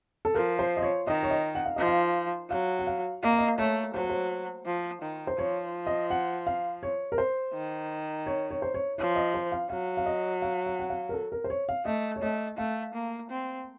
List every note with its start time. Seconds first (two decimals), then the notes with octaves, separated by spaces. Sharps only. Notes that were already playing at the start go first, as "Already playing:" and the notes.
0.25 A4
0.35 F3 A#4
0.59 C5
0.77 D#5
0.82 C#5
1.07 D#3 D#5
1.23 C#5
1.31 D#5
1.55 F#5
1.65 F5
1.76 F3 D#5
1.87 F5
2.50 F#3 F5
2.79 F#5
2.87 F5
3.23 A#3 D#5
3.31 F5
3.38 D#5
3.58 A3 C#5
3.94 F#3 C5
4.02 C#5
4.10 C5
4.66 F3
5.02 D#3
5.27 C5
5.38 F3 C#5
5.87 D#5
6.10 F#5
6.47 F5
6.83 C#5
7.12 A#4
7.18 C5
7.54 D#3
8.27 C#5
8.51 C#5
8.62 C5
8.74 C#5
8.98 F3 C#5
9.16 D#5
9.34 C5
9.52 F5
9.70 F#3 F5
9.97 F5
10.06 D#5
10.42 F5
10.66 F5
10.79 F#5
10.90 F5
11.09 A#4
11.14 A4
11.32 A#4
11.44 C5
11.50 C#5
11.69 F5
11.85 A3 D#5
12.16 C#5
12.22 A3 D#5
12.58 A3 F5
12.94 A#3
13.30 C4